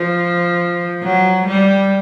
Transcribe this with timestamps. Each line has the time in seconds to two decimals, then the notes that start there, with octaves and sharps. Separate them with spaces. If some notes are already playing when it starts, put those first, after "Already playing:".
Already playing: F3
1.04 F#3
1.47 G3